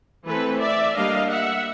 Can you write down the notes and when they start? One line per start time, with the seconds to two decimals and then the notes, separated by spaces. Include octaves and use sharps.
0.26 E3 A3 C4 A4 B4
0.61 D5 E5
0.95 G3 A#3 D4 D#5 F5
1.30 E5 F#5